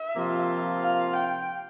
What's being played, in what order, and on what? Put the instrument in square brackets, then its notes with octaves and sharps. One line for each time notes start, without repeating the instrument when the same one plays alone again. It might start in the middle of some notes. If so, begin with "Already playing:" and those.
Already playing: [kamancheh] E5
[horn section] C3 F3 A#3 F4
[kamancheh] F5
G5